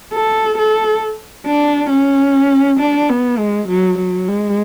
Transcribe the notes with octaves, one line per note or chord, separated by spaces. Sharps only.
A4
A4
D4
C#4
D4
B3
G#3
F#3
F#3
G#3